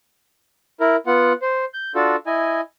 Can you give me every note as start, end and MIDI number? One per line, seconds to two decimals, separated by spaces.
0.80 0.96 64
0.80 0.96 70
1.07 1.33 59
1.07 1.33 65
1.07 1.33 78
1.42 1.65 72
1.74 1.92 91
1.95 2.16 62
1.95 2.16 65
1.95 2.16 66
1.95 2.16 69
2.26 2.61 64
2.26 2.61 75
2.26 2.61 80